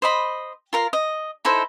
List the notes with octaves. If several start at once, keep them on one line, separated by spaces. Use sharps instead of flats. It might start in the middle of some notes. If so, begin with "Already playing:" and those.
C5 D#5 B5
F4 A#4 F5
D#5
D#4 E4 A4 C5